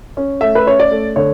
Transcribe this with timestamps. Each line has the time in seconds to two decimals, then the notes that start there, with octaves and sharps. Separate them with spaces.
0.17 C#4
0.41 A3 E5
0.55 B4
0.66 C#4 C#5
0.80 D5
0.91 A3
1.16 D3 C#5